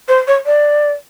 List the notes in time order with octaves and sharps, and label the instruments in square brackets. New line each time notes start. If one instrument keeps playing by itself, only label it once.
[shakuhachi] C5
C#5
D5